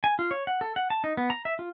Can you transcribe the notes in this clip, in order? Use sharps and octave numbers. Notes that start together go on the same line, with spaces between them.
G#5
F4
C#5
F#5
A4
F#5
A5
D#4
B3
A#5
E5
F4